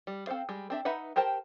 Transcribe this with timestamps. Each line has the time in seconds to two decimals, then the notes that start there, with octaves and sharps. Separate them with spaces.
0.07 G3
0.27 C4 A4 C5 F5
0.49 G3 G#3
0.70 C4 D4 E5
0.85 D#4 B4 E5 F#5
1.16 G4 A#4 C5 G5 A5